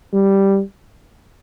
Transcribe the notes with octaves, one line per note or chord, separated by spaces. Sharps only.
G3